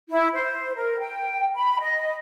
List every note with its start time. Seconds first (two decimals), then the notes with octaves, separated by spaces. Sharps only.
0.10 E4
0.34 C5
0.75 A#4
0.99 G5
1.55 B5
1.80 D#5